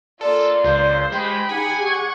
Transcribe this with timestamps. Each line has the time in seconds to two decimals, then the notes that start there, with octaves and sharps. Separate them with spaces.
0.21 A#3 F4 A4 D5
0.64 C#2 C5
1.12 G#3 G4 G5 B5
1.49 D#4 G#4 F#5 G#5
1.79 G4 C#6 G#6